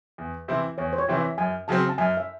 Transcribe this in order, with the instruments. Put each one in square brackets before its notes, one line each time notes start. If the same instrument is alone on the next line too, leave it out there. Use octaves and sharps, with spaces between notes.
[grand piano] E2
C3 E3 C4 E4
[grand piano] E2 [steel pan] C#5
[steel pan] C5
C#5
[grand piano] C3 E3 C4 E4
[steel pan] E5
[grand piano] F#2 [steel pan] G#5
[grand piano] C#3 F#3 C4 [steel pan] A5
[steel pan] A5
[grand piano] F#2 [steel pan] G#5
[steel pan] E5